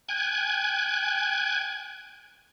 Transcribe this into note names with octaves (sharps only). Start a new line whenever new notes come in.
G5 G#5 F#6 G#6